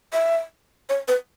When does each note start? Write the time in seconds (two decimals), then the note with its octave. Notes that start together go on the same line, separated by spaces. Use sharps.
0.13 E5
0.89 C#5
1.08 B4